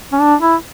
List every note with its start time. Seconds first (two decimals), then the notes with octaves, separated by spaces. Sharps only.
0.12 C#4
0.21 D4
0.41 E4